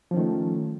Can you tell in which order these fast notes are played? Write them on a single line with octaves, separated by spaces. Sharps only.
F3 C#4 D#3 A3